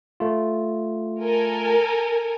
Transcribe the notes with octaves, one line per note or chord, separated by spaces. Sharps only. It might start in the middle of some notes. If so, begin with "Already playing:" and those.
A3 F4
A4 A#4 G#5